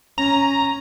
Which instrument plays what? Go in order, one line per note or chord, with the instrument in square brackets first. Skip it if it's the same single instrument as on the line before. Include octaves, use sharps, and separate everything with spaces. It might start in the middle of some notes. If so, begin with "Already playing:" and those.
[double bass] C#4 [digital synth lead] A#5